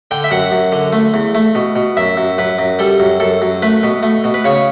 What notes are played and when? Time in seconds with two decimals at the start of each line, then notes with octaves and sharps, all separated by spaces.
0.11 D3 G5
0.24 E5
0.31 F#2 F#5
0.52 F#2
0.72 D3
0.93 A3
1.14 E2
1.35 A3
1.55 B2
1.76 B2
1.97 F#2 E5
2.17 F#2
2.38 F#2 B4
2.59 F#2
2.79 G3 A4
3.00 F#2
3.20 F#2 A4
3.42 F#2
3.62 A3 B4
3.83 B2
4.03 A3
4.24 B2
4.34 B4
4.44 C#3 C#5